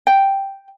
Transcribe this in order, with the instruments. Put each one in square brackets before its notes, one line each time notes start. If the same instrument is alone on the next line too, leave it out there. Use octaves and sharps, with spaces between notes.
[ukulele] G5